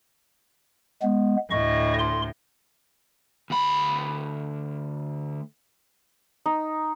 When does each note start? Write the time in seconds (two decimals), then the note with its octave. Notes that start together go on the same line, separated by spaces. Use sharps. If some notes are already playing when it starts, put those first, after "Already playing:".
1.02 G#3 B3
1.50 D2 A2 D#5 C#6
1.98 C6
3.50 D2 B5
6.46 D#4